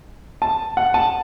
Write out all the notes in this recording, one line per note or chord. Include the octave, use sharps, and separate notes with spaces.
A5
F#5
A5